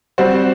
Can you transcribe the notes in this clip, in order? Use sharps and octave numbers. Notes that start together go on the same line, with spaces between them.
G3 C4 F#4 C5